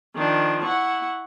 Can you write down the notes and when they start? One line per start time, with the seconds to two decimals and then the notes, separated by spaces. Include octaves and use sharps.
0.14 D#3 F3 D4
0.63 E4 F#5 C#6